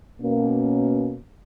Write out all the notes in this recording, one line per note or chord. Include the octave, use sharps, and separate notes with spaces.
B2 A#3 C#4